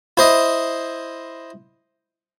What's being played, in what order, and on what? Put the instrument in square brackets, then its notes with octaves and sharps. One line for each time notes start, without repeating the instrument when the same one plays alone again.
[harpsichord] E4 C5 D#5